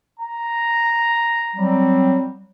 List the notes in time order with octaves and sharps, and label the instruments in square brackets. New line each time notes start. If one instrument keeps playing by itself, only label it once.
[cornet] A#5
[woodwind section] F#3 G3 C4